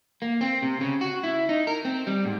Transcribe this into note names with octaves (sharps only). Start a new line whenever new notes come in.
A#3
C4
C3
C#3
F#4
E4
D#4
A#4
C4
G3
G#2